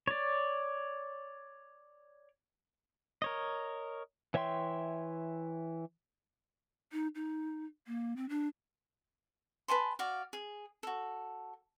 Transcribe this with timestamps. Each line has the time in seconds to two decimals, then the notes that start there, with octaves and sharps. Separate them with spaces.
0.07 C#5 D5
3.22 A#4 C#5 D#5
4.34 E3 C#5 E5 G5 C6
6.92 D#4
7.15 D#4
7.87 A#3
8.16 C4
8.29 D4
9.68 B4 G#5 A5 C6
9.99 F#4 D5 F5
10.33 G#4
10.83 F#4 A4